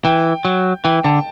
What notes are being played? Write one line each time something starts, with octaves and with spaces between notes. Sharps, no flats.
E3 G5
F#3
E3 G5
D3 A5